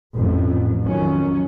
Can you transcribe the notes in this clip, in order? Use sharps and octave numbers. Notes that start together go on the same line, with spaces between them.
A1 F2 A2
F2 D#3 F#3 C#4